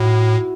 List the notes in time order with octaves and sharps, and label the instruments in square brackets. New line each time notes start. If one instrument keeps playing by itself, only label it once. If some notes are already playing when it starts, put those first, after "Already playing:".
Already playing: [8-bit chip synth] A2 [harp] E4 F#4